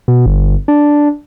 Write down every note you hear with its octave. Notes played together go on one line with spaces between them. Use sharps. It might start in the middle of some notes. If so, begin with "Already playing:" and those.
B2
G1
D4